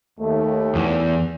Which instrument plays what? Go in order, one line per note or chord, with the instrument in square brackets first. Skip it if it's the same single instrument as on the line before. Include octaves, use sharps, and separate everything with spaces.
[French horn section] D#2 A3
[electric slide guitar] E2